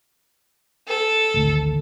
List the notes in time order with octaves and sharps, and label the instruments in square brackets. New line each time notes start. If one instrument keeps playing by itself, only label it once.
[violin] A4
[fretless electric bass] G#1 D2